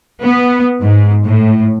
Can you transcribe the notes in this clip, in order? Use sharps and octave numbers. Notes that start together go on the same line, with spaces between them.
B3
G#2
A2